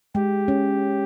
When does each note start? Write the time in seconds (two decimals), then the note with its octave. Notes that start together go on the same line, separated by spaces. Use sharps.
0.15 G#3 G4
0.48 C#4